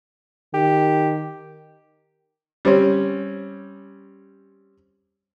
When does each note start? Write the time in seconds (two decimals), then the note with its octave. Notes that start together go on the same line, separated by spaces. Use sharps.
0.54 D#3 G4
2.65 G3 C4 C#4